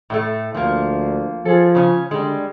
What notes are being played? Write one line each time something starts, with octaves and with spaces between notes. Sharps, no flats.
A2 G3 A3
D2 F3 A#3
F3 G#4 A4
C#3 C#4
D3 G3 G#3